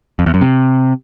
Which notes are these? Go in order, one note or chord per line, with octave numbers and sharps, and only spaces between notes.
F2
E2
F#2
C3